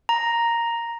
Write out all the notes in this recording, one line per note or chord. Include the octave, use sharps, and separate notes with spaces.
A#5